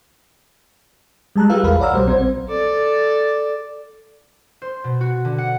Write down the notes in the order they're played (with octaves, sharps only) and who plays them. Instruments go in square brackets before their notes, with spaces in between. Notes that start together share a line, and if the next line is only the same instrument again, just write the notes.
[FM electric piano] G3 G#3 A5 A#5 F#6
F4 G4 G#4 B4 F5 E6
A#1 E2 G#4 A#4 F5 B5
C#5 D5 F#5 A#5 E6 F6
B1 F#3 G3 C5
A#1 C4 C5 G#6
[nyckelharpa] A4 D5
[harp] C5
B2
F#4
D3
F#5